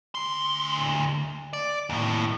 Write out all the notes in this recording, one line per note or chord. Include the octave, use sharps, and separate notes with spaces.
D2 C6
D5
D#2 A2